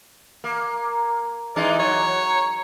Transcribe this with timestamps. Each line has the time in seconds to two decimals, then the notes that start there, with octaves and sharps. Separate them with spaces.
0.44 A#3
1.56 E3 G#3 D#4 D5
1.79 F#3 C#5